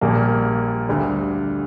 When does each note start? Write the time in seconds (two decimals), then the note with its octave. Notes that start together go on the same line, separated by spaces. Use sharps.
0.01 A#1 A#2 G3 A#3
0.89 D2 D3 G3